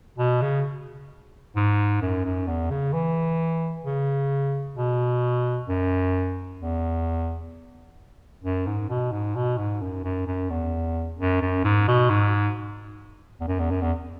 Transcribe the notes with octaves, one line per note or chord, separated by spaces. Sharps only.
B2
C#3
G#2
F#2
F#2
E2
C#3
E3
C#3
B2
F#2
E2
F#2
G#2
B2
G#2
B2
G#2
F#2
F#2
F#2
E2
F#2
F#2
G#2
B2
G#2
E2
F#2
E2
F#2
E2